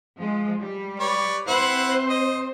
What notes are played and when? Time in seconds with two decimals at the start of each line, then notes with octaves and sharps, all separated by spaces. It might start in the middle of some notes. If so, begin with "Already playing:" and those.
0.18 F3 G#3
0.60 G3
1.00 B4 C#5 D5
1.48 C4 E4 B4 C5 F#5
2.10 D#5